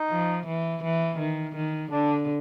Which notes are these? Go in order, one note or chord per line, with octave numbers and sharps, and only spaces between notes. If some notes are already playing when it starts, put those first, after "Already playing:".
Already playing: D#4
F3
E3
E3
D#3
D#3
D3 D4